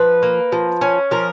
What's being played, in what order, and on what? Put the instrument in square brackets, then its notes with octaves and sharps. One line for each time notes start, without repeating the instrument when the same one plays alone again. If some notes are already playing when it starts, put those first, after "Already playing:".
Already playing: [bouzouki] F3 B4
A#3
F3
C#4
F3 A#4